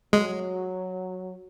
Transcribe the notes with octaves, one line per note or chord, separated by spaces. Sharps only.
F#3 G#3